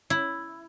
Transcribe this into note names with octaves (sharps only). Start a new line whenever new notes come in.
E4